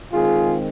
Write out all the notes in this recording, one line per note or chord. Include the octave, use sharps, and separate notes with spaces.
D#3 G#3 C4 F4 G#4